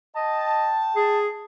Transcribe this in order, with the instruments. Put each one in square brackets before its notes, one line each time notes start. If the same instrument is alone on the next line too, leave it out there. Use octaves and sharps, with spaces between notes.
[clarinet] D#5 [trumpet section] G5 A5
[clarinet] G#4